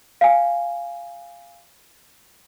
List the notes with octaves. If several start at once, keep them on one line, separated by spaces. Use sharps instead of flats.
F5 G#5